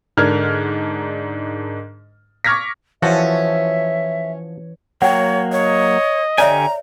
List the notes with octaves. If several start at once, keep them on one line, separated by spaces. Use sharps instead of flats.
G#2 D3 D4 A#4 F6 G#6
C#6 D6 F6 G#6 A#6 B6
E3 F3 C#4 F#4 A4 E5
F#3 A#3 C#5 F#5 G5
C#5 D#5
D3 G4 C#5 D5 E5 G#5 A#5